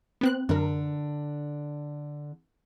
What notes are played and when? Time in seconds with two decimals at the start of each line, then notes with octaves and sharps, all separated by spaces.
0.21 B3 C4 F#6
0.49 F#2 D3 D4 A#4